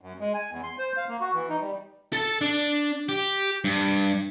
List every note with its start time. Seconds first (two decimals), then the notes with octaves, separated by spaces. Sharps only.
0.01 F#2
0.20 G#3
0.34 G#5
0.51 E2
0.63 C6
0.79 C5
0.97 F5
1.09 A#3
1.21 F#4
1.34 E3
1.49 D#4
1.61 G3
2.13 A4 A5
2.41 D4
3.09 G4
3.64 G2